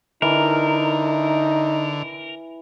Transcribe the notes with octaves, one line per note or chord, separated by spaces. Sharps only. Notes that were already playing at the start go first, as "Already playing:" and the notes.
D3 E3 D#4 A#4